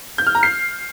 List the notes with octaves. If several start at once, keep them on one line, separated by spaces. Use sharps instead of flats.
G6
F6
A#5
C7